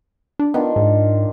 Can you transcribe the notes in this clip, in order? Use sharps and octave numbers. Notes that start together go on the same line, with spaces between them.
D4
D#3 B3 D4 F4
G#2